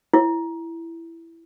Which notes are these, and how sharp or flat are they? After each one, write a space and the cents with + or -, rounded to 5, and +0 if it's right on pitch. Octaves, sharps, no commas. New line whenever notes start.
E4 +10